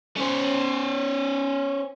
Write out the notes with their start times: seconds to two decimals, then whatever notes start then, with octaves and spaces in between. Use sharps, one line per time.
0.16 C#4 C5